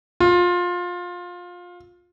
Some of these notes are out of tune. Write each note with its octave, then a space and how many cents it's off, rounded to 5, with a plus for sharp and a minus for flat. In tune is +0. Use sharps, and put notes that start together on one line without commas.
F4 +20